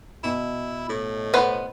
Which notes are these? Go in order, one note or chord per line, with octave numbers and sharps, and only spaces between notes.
B2 E4
A2
B3 B4 C5